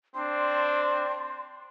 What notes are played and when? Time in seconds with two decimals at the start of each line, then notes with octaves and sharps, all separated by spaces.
0.15 C4 D4 C6